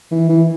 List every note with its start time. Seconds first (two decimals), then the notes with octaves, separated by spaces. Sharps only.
0.11 E3
0.29 E3